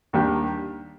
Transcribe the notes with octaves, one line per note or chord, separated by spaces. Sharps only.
D#2 D#3 G3 D4 G4